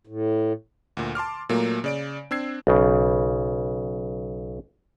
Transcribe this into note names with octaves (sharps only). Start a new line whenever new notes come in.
A2
D2 A#2
A5 C6 D6 F6
A#2 F#3 A3 A#3
C#3 D5 D7
C4 D4 E6 G#6 C7
B1 C#3